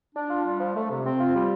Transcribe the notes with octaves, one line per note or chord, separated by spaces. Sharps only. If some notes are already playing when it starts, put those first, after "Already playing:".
D4
F4
G3
F3
A3
C3
C4
F4
G3